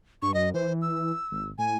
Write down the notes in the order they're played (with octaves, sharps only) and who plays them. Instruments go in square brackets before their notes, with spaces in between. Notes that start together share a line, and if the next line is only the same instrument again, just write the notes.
[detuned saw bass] G2 [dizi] C#6
[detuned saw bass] F#2 [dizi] D#5
[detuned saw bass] E3 [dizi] C5
[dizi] E6
[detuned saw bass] G#1
[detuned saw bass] A2 [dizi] G#5